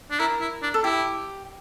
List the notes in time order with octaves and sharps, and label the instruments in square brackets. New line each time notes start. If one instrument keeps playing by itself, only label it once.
[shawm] D4
[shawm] E4 [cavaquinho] A#4
[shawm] E4
D4
[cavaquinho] A4
[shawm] E4 [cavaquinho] G4